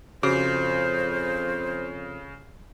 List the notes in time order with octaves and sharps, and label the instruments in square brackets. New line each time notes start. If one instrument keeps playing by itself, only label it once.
[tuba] F2 [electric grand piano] C#3 [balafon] F#4 [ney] C5